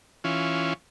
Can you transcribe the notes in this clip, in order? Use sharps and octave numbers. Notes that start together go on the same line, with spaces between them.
E3 C#4 F4